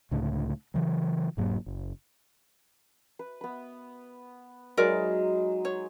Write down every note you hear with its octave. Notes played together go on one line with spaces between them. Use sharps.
C#2 A2 D3
C#3 E3 F#3
E1 G#2 F#3 A#3
F#1
B4
B3 B5
F#3 G#3 D#4 A#4 D5
C#5